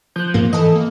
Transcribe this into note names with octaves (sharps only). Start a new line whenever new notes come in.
F3 F#6 G6
G#2 A#3
E3 A4 D#5
A#3